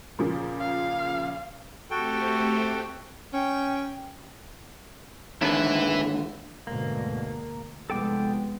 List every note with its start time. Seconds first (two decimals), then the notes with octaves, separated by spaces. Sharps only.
0.19 A#2 C#3 F3
0.60 F5
1.91 A3 C4 F#4 G4 A4 G5
3.33 C#4 G5
5.42 D#2 G#2 D3 E4 B4
6.67 D2 G#2 B2 A#3
7.90 F1 G#3 B3 A4 G5 D6